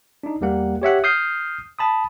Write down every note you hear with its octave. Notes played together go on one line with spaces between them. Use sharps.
D4 D#4
E2 G3 A#3 F#5
G4 C#5 E5 F#5
D#6 F6 G6 C7
A5 B5 D#6